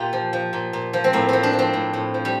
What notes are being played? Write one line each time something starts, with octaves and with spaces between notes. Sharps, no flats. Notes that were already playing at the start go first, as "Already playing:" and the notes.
Already playing: A#2 F4 G4
F3
F3
A#2
A#2
F3
C4
A2 A#3
F3 C4
D4
F3
C4
A2
A2
F3
G3